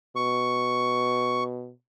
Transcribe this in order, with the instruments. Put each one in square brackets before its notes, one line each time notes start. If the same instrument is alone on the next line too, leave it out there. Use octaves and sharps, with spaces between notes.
[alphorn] B2 [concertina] C#6